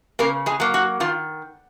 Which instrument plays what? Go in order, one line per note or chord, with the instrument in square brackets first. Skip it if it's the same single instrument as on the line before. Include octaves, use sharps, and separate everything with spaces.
[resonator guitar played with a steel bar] C#3 A#3 A#4
G#3 G#4
F#3 A#3
F#4
D#3 F4